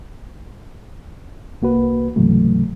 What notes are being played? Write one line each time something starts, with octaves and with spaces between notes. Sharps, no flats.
C2 A#3 F#4 B4
C#2 G#2 C3 E3 F#3 A3